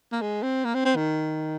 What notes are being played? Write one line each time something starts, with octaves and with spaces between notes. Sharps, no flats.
A#3
G#3
C4
A#3
C4
C4
D#3